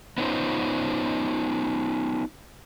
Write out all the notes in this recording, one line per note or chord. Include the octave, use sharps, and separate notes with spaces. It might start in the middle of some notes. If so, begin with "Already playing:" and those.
B3 C#4 D#4 F4 C5